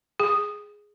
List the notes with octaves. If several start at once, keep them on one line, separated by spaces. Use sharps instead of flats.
G#4